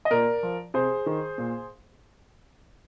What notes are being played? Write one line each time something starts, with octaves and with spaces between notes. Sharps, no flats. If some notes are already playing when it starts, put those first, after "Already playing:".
D#5
A#2 A#4 D5
F3
C3 G#4 C5
D#3
A#2